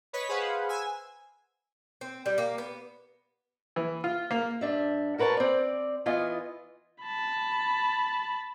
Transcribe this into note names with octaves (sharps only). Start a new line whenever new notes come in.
B4 C#5 D#5 B6
G#4 B4 C5 F5 F#5
G#5 E6
C4
G3
A#3
B3
E3
F4
A#3
G2 D4 E5
F#4 A#4 B4 C#5 A5
C4 D5
E3 B3 F4 D#5 G#5
A5 B5